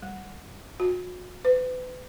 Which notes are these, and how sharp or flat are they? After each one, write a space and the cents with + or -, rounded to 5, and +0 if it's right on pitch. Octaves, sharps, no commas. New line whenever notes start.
G3 +0
F#4 -40
B4 +35